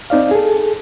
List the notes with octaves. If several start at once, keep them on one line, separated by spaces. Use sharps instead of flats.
C4 D#4 D5 F5
G#4 A4